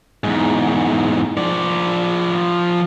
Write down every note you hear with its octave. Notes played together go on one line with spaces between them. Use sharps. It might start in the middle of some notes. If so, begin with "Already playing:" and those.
E2 G#2
F3 D5